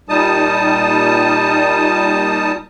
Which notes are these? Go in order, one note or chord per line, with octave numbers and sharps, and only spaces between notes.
A#2 G3 D#4 A5 D#6